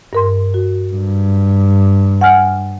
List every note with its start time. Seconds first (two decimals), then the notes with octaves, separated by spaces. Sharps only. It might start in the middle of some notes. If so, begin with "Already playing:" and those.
0.13 G2 A#4 C6
0.54 F#4
0.93 G2
2.21 F#5 G#5 F6